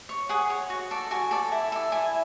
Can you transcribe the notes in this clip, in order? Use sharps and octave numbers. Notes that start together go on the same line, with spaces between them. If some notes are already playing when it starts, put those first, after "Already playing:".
C#5
G#4 F#5
C#5
F#4
A4 D5
F#4 G#5
A4 D5
E4
A4 D5
E4 G#5